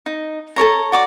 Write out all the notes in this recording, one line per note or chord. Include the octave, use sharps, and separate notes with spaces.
D#4
A4 A#4 C#5 A#5
F#4 D5 D6